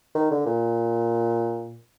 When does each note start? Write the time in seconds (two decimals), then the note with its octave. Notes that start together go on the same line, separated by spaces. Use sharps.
0.15 D#3
0.31 D3
0.46 A#2